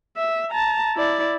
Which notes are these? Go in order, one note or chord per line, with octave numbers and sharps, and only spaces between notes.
E5
A5 A#5
E4 D5